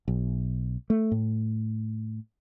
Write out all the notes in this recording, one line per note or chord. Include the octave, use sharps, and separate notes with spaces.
B1
A3
A2